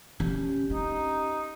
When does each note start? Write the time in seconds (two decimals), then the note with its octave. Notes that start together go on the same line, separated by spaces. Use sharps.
0.20 C#4 D4 G4
0.70 C#4 D#4